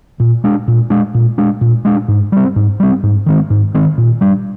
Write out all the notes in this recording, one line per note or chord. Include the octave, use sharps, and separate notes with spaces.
A#2
G#3 D4
A#2
G#3 D4
A#2
G#3 D4
A#2
G#3 D4
G#2
G3 C4
G#2
G3 C4
G#2
D#3 G#3 C4
G#2
D#3 G#3 C4
A#2
G3 D4